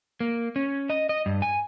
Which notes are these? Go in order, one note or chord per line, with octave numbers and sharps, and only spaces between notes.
A#3
C#4
D#5
D#5
G2
G#5